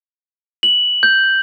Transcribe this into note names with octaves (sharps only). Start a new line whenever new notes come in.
F#7
G6